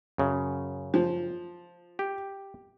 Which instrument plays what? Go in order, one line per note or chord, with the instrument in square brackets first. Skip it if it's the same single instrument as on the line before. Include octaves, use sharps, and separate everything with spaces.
[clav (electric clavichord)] F#2 C#3
[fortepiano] F3
[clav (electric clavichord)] G4